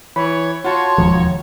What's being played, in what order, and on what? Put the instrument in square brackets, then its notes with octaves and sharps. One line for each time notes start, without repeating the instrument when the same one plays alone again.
[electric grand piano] E3 [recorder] C#5 [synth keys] B5
[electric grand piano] F4 F#4 [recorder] C#5 [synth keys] F#5 A5 C6
[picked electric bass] E1 D#2 F3 [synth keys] D#3 G#3